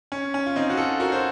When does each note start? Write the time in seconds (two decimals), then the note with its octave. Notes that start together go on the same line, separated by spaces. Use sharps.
0.12 C#4
0.34 C#4
0.46 F4
0.56 C4 D#4
0.70 F#4
0.77 F4 A4
1.00 F#4 A#4
1.12 C5